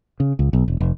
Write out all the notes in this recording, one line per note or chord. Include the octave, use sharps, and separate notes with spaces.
C#3
C#2
B1
E1
F1